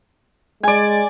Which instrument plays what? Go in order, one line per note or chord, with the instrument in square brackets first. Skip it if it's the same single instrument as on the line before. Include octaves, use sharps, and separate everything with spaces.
[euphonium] G#3 [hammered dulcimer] D5 G#5